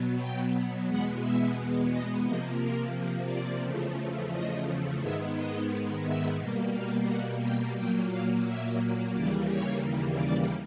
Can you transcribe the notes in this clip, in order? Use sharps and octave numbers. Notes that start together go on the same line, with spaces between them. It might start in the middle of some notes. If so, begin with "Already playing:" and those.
Already playing: B2 F#3 B3
G5
E2 B2 G#3 B3 F#5
E5
D#5
C3 F3 A#3 D#5
A#4
D5
E2 C#3 F3 A3
D#5
G#2 D#3 G#3 B3 E5
D#5
E5
B2 G3 A#3
F5
F#5
G5
A#2 F#3 A#3 G5
F5
E5
D#2 C#3 E3 G3 A#3 D5
C#5
D5